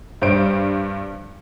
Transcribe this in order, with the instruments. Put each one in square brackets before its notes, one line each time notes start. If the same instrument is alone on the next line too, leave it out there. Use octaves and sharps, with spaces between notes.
[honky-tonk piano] G2 G3 C5 D7